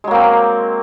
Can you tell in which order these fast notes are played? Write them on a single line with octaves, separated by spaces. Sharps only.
G#3 F#3 A#3 C4